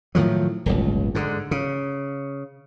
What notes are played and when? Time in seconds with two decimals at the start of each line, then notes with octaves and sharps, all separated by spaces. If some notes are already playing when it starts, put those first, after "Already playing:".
0.15 A2 D#3 F3 F#3
0.66 D1 G1 C#2
1.15 G#2 D3
1.51 C#3